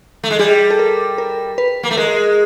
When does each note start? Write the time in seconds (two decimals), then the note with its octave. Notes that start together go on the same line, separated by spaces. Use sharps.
0.24 A3
0.30 G#3
0.39 G3 G#4
0.70 A4
0.79 A#4
1.18 A#4
1.58 B4
1.83 A#3
1.91 A3
1.97 G#3 A#4